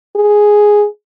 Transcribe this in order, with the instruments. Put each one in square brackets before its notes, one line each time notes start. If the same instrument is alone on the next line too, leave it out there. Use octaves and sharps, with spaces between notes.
[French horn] G#4